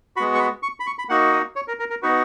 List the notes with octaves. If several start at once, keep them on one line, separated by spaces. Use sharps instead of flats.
G#3 B3 F#4 B5
C#6
B5
C#6
B5
C#6
B5
A#3 D#4 F#4 F#5
D#5
C#5
A#4
A#4
A#4
B3 D#4 F#4 B4